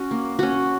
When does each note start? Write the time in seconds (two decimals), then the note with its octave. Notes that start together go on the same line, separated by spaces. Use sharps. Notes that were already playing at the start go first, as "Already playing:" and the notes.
Already playing: C#4 F#4
0.11 A#3
0.39 C#4 F#4